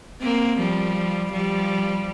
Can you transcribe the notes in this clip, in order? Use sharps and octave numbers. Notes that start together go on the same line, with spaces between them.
A#3 C4
F3 G3
F3 G3